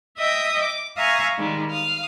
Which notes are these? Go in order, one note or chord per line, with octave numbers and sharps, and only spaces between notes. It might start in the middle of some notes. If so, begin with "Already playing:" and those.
D#5 E5 G5 D#6
D6
E5 F5 G#5 A#5 C#6 D#6
D#3 G3 G#3
F5 D#6